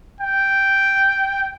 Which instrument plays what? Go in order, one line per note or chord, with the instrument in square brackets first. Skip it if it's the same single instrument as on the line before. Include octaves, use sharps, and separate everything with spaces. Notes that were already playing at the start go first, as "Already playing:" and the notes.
[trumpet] G5